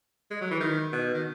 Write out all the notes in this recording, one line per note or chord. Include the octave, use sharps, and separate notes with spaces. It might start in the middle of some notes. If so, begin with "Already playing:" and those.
G#3
F#3
E3
D#3
B2
D#3